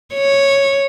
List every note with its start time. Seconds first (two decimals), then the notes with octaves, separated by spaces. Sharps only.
0.14 C#5